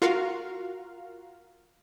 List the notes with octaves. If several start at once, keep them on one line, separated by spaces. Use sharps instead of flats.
F4 F#4 A#4 F5